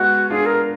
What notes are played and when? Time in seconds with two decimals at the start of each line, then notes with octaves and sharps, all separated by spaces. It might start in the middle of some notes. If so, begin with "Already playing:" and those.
Already playing: G#3 B3 F#4
0.30 D4 F4 G#4
0.46 A#4